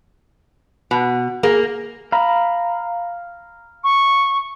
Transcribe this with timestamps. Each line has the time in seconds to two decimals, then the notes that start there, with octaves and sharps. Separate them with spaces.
0.91 B2
1.43 A#3 G#4
2.12 F5 A#5 B5
3.84 C#6